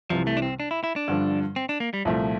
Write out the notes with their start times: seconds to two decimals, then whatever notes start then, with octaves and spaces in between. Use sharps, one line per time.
0.10 C2 C3 E3 F3
0.27 A3
0.37 D4
0.42 C4
0.60 D4
0.71 E4
0.84 E4
0.96 D4
1.08 G2 D3 F3
1.56 C4
1.69 D4
1.80 A#3
1.94 G3
2.05 C2 A#2 F3 A3